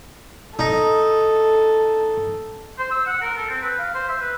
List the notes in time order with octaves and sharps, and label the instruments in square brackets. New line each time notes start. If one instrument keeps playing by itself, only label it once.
[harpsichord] D#4 [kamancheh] A4
[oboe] C5
E6
F#5
A#4
A4
C4
B4
F5
C5
E5
B4